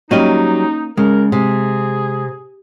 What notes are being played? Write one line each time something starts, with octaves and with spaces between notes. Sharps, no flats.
F#3 G3 A#3 C#4 D#4 G4 D#5
C#3 G#3 A#4
C3 G#4